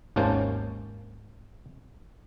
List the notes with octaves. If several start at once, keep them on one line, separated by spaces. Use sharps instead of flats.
G#1 D#2 A#3 C#4 C5 A5